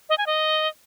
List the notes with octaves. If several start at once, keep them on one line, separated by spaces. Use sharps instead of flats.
D#5
G#5
D#5